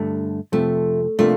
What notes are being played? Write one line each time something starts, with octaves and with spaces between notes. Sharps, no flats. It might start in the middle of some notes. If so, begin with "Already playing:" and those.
Already playing: G2 D3 A3
F2 C3 F3 A3
C3 F3 A3 A#3 D4 F4